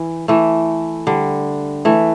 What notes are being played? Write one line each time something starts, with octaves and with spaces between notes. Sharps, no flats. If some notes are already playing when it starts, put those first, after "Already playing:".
Already playing: E3
E3 A3
D3 G3
E3 A3